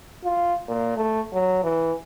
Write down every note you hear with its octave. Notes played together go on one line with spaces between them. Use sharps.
F4
A#2
A3
F#3
E3